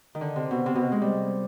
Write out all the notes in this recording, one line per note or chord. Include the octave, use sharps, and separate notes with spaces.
D#3
D3
C3
B2
C3
B2
C3
G#3
G3